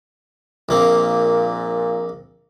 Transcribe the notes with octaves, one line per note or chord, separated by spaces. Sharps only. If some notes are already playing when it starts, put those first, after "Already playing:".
A#1 A#2 A#3 C4